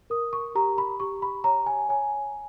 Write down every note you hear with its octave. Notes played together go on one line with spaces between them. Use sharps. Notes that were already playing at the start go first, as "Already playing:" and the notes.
A#4 D#6
C#6
G4 A#5
B5
G4 C#6
B5
C#5 A#5
G#5
C#5 G#5